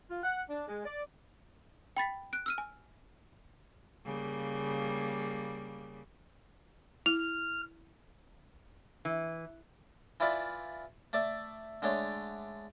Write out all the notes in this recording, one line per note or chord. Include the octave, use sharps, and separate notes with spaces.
F4
F#5
D4
G#3
D5
G5 B5 A6 B6
F#6 D7
E6 F6 D#7
G#5
C#3 G3 A#3
E4 F6 F7
E3
E3 E4 F4 D5 B5
A3 D5 E5
D3 G#3 A3 D4 C#5